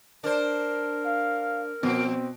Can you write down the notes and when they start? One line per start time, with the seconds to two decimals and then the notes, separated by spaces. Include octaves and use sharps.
0.24 D4 A#4 C5
1.06 F5
1.83 B2 F3 C4